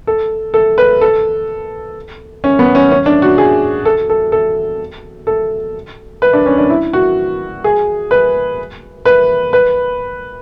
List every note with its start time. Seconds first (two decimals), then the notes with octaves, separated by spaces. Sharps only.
0.07 A4
0.54 A4
0.78 B4
1.01 A4
2.44 C#4
2.59 B3
2.75 C#4
2.91 C#4
3.06 D4
3.22 F#4
3.38 G#4
3.85 A4
4.10 A4
4.32 A4
5.27 A4
6.22 B4
6.33 D4
6.46 C#4
6.58 D4
6.69 E4
6.93 F#4
7.64 G#4
8.11 B4
9.05 B4
9.53 B4